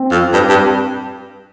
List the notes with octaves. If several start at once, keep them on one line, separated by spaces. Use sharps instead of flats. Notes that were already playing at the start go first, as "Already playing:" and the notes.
Already playing: C4
F2
G2
G2